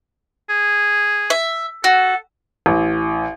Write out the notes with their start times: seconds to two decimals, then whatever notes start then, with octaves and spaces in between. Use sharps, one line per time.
0.50 G#4
1.30 E5
1.84 F#4 A4
2.66 A1